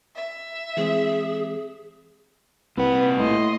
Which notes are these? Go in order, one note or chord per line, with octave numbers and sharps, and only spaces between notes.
E5
E3 G#3 C4 G#4
C2 A#2 B4 F#5
A2 D#5 C6